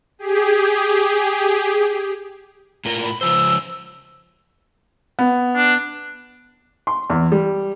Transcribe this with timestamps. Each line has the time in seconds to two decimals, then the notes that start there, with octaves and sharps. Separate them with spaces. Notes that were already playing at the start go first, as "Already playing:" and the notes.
0.19 G4 G#4
2.85 A2 F4 A#4
3.03 B5
3.21 C#3 F3 C5 E6
5.19 B3
5.56 D4
6.87 C6
7.10 E2
7.32 G3